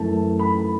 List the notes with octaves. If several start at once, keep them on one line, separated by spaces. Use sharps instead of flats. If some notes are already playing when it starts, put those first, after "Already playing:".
Already playing: F#2 E3 A3 A5
B5